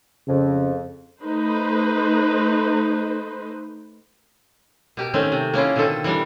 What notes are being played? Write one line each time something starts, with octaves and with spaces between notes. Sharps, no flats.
F2 C#3
A3 D#4 B4 C5
B2 G4 A#4
D#3 A3 C4 C#4
C3
A#3 C#4 E4 F4
B2 D3 D#3 C4 A4
E3 G3 D4